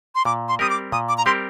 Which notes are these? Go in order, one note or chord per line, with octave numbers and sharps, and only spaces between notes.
C6
A#2 D6
C6
G3 C4 G4 A#4 D#6
D6
A#2 D#6
D6
A#5
G3 C4 G4 A#4 C6